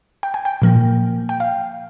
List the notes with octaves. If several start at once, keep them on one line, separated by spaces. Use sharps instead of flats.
G5
G#5
G5
A#2 F3 A#3
G5
F5